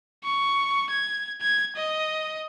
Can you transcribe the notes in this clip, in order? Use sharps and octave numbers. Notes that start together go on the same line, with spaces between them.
C#6
G#6
G#6
D#5